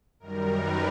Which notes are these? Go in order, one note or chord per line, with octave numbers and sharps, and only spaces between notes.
F#2 D#3 G3 A#4
B4